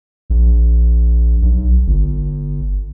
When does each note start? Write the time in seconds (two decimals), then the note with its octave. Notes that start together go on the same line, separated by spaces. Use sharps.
0.30 A#1
1.42 B1
1.87 G1